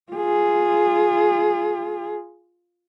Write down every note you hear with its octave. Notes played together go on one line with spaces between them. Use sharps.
F4 G#4